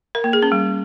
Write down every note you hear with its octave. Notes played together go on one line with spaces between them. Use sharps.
A#4
A#3
G#4
C#4
G3